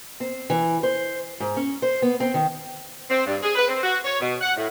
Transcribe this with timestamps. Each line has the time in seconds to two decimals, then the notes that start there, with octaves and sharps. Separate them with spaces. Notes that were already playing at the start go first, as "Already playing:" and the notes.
0.20 C4
0.50 E3
0.83 C5
1.40 G#2
1.57 C#4
1.82 C5
2.02 B3
2.20 C4
2.34 D#3
3.09 C4
3.25 G2
3.42 G#4
3.55 B4
3.67 C4
3.82 F#4
4.04 C#5
4.20 B2
4.41 F#5
4.56 A2